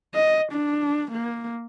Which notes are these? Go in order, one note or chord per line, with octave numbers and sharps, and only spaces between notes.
D#5
D4
A#3